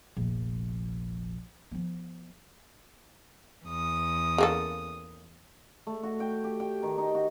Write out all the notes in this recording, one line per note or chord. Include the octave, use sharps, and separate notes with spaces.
F1 A#1
F3 B3
E2 D#6
C#3 A#3 A4
A3
F#4
G5
G4
G5
D#3
D#4
F#4